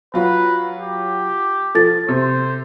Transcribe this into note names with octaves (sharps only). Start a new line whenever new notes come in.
F#3 F4 F#4 B4
G4
F3 A4 A6
C3 C5